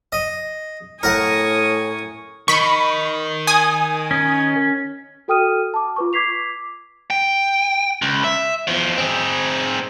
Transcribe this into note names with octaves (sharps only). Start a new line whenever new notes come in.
D#5
A2 A#4 F#5 G#5 C#6 D#6
D#3 B5 C#6
G#5 D#6
C#4
F#4 A4 G5 D#6 F6 D#7
A5 D6
F4 B4 C#6
D6 G#6 B6 C7 F7
G5
C#2
E5
E2 F3
C4 G#4